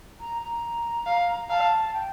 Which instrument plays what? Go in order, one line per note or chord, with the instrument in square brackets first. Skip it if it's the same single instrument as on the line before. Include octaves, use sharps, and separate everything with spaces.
[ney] A#5
A#5
[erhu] F5
[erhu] F5 [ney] A5
[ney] G5